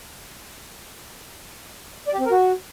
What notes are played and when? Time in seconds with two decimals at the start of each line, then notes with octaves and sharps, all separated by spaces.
2.08 D5
2.14 G4
2.20 C4
2.25 A#4
2.31 F#4